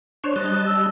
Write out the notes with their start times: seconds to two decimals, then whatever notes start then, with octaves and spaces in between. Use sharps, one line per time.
0.24 D4 C5 C#5
0.36 G3 D#5 A5 F#6
0.66 E6